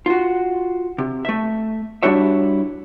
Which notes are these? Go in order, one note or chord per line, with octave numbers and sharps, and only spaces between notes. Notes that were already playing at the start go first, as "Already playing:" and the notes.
F4 F#4
C3
A3 E5
G3 D4 E4 F#4 C#5 E5